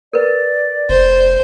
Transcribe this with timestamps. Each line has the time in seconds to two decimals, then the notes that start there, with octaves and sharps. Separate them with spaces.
0.13 A#4 B4 D5
0.89 F1 C5